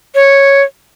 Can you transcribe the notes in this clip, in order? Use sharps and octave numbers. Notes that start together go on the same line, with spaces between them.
C#5